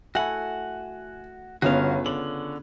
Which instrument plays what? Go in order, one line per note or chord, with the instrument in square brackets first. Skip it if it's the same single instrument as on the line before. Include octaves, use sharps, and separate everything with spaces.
[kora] A3 E4 [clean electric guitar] F#4 F#5 [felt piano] G#5
[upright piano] G1 [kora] C#3 [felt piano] B3 C#4 F4 [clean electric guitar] F#4 F5
[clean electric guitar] D3 [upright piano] F#7